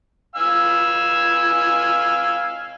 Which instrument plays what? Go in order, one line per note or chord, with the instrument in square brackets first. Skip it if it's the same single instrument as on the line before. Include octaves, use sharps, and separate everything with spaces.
[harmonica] F5 G#5 E6